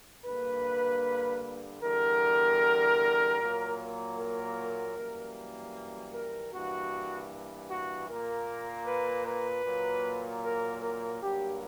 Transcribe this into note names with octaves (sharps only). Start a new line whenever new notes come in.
G2 D3 A#3 B4
E2 D3 G3 A#4
A#2 F#3 A#3
A#4
F#2 E3 G3 A#3
A#4
G2 E3 A#3 F#4
F#4
A#2 A#3 A#4
B4
B4
A#2 F#3 A#3
A#4
A#4
G2 F#3 A#3 G4